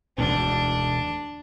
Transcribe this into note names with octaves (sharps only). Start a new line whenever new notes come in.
E1 D2 G#2 D4